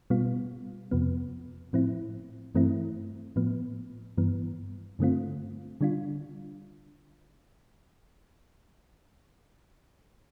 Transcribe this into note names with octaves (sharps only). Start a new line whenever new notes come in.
B2 G3 B3 F4
F2 C3 F3 B3
A2 F3 C4 E4
G2 E3 A3 C4 E4
A2 F3 B3
G2 E3 B3
G2 D3 A3 C4 F4
D3 G3 D4 F4